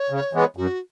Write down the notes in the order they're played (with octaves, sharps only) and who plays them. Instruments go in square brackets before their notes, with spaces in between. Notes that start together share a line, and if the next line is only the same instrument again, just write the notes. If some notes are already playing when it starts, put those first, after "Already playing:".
Already playing: [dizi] C#5
[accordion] C#3
E3 G#3 B3
[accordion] F#2 [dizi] F#4